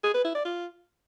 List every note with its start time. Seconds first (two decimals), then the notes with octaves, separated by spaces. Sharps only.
0.04 G#4
0.14 B4
0.24 E4
0.35 D5
0.45 F4